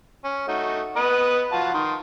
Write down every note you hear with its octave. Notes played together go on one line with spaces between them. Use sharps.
C#4
A3 D#4 F#4
B3 B4 D#5
F4 F#4 A5
D#3 C6